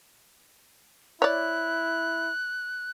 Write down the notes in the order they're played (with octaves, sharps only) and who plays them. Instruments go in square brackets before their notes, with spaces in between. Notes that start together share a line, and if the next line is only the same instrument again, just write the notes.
[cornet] E4 [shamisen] C#5 D5 [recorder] F#6